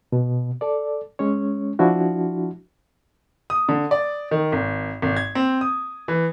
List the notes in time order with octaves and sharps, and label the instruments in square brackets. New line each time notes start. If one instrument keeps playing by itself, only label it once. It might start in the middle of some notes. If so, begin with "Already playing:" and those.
[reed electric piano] B2
A4 D5
G#3 C#4 C#5
F3 D4 E4 F#4
[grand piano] D#6
D3
D5
D#3
G#1
G#1
G#6
C4
D#6
E3